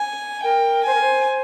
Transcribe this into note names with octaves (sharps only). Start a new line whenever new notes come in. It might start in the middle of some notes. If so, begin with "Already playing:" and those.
Already playing: G#5
A#4 G5
C5 G#5
A#4
C5